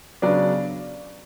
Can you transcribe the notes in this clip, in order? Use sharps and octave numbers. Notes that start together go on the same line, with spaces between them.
C#3 F#3 B3 D4 D5